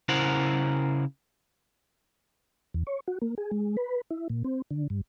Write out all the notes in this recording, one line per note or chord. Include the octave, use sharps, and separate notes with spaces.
C#3 E4 A#4 C5 F#5
E2
C#5
F#4
A#3
G#4
G#3
B4
E4
A#2
C4
D3
G2